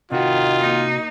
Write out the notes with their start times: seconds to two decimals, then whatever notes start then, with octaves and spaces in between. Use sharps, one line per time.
0.11 C3 D#3 F4 F#4
0.60 A#3 D#4